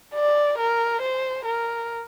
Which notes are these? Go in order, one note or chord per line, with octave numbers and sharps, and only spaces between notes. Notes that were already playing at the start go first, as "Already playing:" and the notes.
D5
A#4
C5
A#4